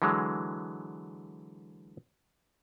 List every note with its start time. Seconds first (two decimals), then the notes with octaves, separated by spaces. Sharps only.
0.02 D3 E3 F#3 G#3